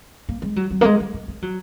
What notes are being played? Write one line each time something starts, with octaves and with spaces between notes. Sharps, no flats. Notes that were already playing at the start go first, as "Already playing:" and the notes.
A#3
G#3
F#3
F#3
A#3
G#3
G#3
G#3
G#3
F#3